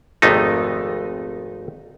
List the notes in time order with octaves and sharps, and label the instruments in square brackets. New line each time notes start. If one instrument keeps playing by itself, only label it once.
[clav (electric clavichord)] G#1 F2 C3 A3 B3 D#4